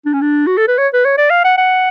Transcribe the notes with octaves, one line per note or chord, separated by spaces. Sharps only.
D4
C#4
D4
F#4
A4
B4
C#5
B4
C#5
D5
F5
F#5
F#5